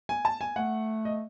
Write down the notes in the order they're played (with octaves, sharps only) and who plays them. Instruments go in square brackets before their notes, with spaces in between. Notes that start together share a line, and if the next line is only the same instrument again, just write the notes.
[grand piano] G#5
A5
G#5
[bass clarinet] A3 [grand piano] F#5
[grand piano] D#5